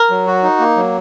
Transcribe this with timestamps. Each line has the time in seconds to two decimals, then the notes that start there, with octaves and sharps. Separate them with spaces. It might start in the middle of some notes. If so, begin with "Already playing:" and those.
Already playing: A#4
0.10 F#3
0.27 F#4
0.43 D#4
0.60 A#3
0.77 F#3